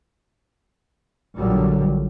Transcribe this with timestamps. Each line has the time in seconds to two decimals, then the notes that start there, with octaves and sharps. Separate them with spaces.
1.37 A#1 A#2 D3 F#3 G3